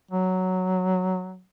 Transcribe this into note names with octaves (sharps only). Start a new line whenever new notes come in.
F#3